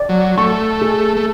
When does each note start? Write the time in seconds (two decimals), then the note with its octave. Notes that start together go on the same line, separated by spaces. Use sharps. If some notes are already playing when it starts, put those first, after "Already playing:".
Already playing: D5
0.09 F#3
0.38 A3 C#6
0.82 G#4
1.17 A3